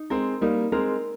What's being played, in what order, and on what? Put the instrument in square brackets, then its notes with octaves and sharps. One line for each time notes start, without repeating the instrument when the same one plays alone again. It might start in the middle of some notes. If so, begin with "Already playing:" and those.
Already playing: [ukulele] D#4
[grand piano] G#3 C4 [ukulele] A#4
[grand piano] G3 A#3 [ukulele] D#4
[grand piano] G#3 C4 [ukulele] A#4